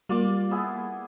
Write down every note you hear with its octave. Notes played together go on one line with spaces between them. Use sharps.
G3 A#3 F4 D5 D6
B3 E4 G#4